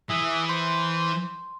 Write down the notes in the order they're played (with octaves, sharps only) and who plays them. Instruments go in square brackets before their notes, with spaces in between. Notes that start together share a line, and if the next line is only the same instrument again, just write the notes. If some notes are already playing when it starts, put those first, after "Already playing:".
[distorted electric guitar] E3 [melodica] G#4 E5
[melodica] C5 [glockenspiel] C6